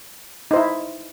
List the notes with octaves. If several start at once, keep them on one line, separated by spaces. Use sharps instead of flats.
D#4 E4 C5